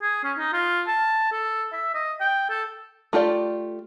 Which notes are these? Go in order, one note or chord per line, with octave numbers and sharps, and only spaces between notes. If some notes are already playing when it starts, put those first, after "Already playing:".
G#4
C#4
D#4
F4
A5
A4
E5
D#5
G5
A4
A3 F4 G4 D5